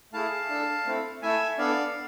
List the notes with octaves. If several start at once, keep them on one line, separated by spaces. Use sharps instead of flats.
A3 E4 G#4 F5 A5
D4 A4
A3 C4 E4 A4
A3 E4 A4 E5 G#5
B3 D4 A4 D5 F5